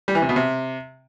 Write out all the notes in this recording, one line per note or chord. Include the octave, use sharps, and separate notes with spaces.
G3
E3
C3
B2
C3